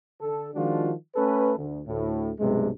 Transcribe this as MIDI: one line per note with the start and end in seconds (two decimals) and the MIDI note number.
0.21 0.48 50
0.21 0.48 69
0.54 0.91 51
0.54 0.91 53
0.54 0.91 56
0.54 0.91 62
0.54 0.91 65
0.54 0.91 66
1.15 1.53 57
1.15 1.53 61
1.15 1.53 69
1.15 1.53 71
1.57 1.80 38
1.87 2.30 38
1.87 2.30 45
2.39 2.68 35
2.39 2.68 43
2.39 2.68 48
2.39 2.68 56